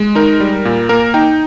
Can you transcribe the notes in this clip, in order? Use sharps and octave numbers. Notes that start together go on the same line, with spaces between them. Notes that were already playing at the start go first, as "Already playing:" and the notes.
Already playing: G#3
D#4 A#4
G3
A#2
A#3 A#4
D#4 G5